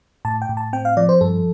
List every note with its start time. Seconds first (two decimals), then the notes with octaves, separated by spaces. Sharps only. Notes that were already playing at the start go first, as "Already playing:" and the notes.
0.25 A2 A5
0.42 G5
0.49 A2
0.57 A5
0.73 C4 G5
0.85 F5
0.97 F3 D5
1.09 C5
1.21 G2 A4